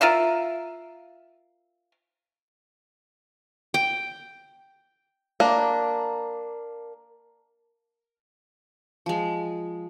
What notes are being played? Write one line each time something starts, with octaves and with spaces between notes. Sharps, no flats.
F4 A#4 E5 F5
G5
A#3 D4
F3 G#3